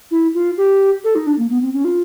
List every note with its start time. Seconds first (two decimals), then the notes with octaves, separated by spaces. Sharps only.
0.11 E4
0.34 F4
0.57 G4
1.04 A4
1.15 D#4
1.27 D4
1.38 A#3
1.50 B3
1.62 C4
1.73 C#4
1.85 F4